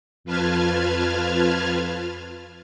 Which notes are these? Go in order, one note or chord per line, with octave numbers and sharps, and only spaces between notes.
F2 F4 B4 A5 F6 G#6